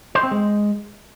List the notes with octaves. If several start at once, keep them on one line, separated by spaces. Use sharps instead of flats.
C5
C4
G#3